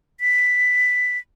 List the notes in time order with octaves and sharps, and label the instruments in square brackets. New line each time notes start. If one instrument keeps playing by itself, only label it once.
[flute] B6